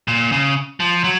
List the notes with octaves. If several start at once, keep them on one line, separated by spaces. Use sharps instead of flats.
A#2
C#3
F3
F#3